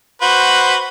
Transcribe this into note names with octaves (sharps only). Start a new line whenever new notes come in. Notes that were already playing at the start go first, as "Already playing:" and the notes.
F#4 B4 C5